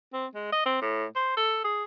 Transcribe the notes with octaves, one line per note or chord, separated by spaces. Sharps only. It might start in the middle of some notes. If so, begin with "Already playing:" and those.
C4
G#3
D#5
C4
A2
C5
A4
G#4